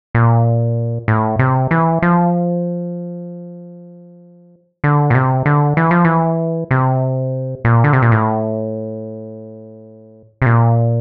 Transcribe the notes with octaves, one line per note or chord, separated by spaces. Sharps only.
A#2
A2
C3
E3
F3
D3
A#2
C3
D3
E3
F3
E3
C3
A#2
D3
C3
A#2
A2
C3
A#2